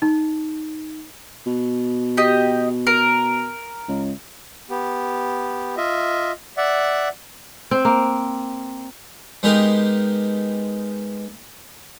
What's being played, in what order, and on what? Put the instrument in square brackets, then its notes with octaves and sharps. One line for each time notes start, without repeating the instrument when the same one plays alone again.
[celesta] D#4
[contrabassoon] B2
[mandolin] G4 D#5
A#4
[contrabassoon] C#2
[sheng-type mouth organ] B3 G4
F4 D#5 E5
D5 E5 F#5
[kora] C4
A#3
[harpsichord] G#3 B3 D#4 G4 A#4